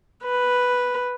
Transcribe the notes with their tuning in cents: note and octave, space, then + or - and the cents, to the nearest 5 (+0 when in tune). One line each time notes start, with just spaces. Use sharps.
B4 +0